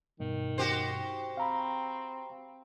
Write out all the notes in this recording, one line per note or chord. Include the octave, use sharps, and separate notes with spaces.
G2 B2 D#3
F#4 G4 C5
C4 F5 A#5 B5